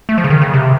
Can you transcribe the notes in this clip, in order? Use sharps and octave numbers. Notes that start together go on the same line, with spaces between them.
A3
F3
C#3
D#3
C#3
C3